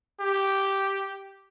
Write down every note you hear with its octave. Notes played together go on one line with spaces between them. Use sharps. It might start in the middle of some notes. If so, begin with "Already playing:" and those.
G4